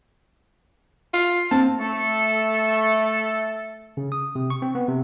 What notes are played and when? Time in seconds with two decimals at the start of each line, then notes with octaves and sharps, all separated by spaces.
1.14 F4
1.51 C4 A5
1.79 A3 A4
3.97 C#3
4.12 D#6
4.35 C3
4.50 C#6
4.62 C4
4.75 B3
4.88 C3